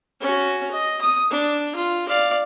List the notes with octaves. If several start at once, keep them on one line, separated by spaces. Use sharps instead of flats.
C#4 F#4
D#5
D#6
D4
F4
D5 F5